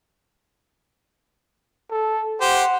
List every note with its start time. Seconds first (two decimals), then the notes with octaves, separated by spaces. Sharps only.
1.91 A4
2.41 G4 C5 F#5